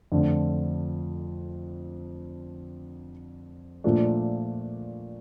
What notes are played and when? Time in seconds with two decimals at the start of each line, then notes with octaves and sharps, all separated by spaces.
0.12 F2 D3 A3
3.84 A#2 F3 A3 D4